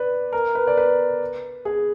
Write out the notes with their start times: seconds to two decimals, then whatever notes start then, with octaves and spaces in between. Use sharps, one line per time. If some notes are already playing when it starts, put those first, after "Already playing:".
Already playing: B4 D5
0.33 A#4
0.55 B4
0.67 D5
0.77 B4
1.65 G#4